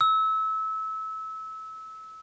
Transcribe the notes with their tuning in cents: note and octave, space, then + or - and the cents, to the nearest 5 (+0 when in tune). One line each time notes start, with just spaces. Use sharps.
E6 -25